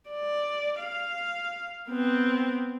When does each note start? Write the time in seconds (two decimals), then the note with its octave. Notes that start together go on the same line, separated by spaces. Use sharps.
0.10 D5
0.80 F5
1.89 B3 C4